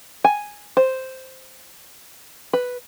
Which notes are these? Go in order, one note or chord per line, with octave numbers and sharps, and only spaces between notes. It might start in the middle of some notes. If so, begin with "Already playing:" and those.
G#5
C5
B4